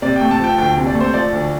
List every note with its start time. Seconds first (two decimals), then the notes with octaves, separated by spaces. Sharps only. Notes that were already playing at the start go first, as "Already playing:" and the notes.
0.02 C3 D5
0.16 A3 G5
0.31 A5
0.40 F3 G5
0.58 D2 G5
0.77 C3
0.87 D5
0.95 A3
1.01 C5
1.14 F3 D5
1.33 D2